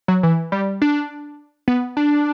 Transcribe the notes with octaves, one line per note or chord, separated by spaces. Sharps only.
F#3
E3
G3
D4
B3
D4